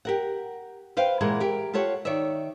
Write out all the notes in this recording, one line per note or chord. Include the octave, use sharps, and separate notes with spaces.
G4 A#4 F#5
B4 C5 F5 G5
A#2 E3 G#3 G#4 A#4 F#5
G4 A#4
F4 G4 A4 C#5 F#5
D#3 C#5 D5 E5